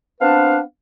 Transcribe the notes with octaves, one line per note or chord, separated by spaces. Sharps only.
B3 C4 D4 B4 F5 A5